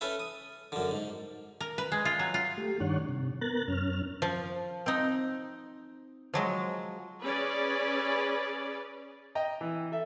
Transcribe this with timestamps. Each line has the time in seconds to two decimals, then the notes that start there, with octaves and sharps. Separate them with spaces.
0.01 C#4 A4 B4 E5
0.20 D#6
0.72 F#2 D3
0.91 G#2
1.60 A#4
1.78 B4
1.92 G#3
2.05 F4
2.19 F#3
2.34 F4
2.58 A3 G4
2.80 G2 D#3 D4 C#5 F#5
3.09 C3
3.41 B3 A#4 A#5 F#6 A6
3.68 F#2 C#4 F6
4.22 F3
4.86 C4 D#4
6.34 F3 F#3 G#3
7.23 C#4 G#4 B4 D5
9.35 D#5 G5 A#5
9.61 E3
9.92 A4 E5